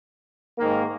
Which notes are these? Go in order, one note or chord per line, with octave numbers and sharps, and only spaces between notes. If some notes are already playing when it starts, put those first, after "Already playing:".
G#2 D#3 A#3